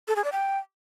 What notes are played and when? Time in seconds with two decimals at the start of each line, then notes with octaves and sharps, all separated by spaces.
0.08 A4
0.16 G#4
0.24 D5
0.32 G5